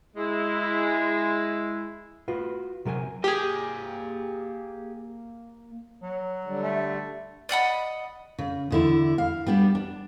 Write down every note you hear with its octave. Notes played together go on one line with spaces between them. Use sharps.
G#3 E4
F4 F#4 B4
C3 F#3 A#4 G#5
A#3 G4 G#4 G#5
F#3
D3 G3
A3
D5 D#5 F#5 B5
C#3
E2 D3 E4
F5
G3 B3 D4 G4
D4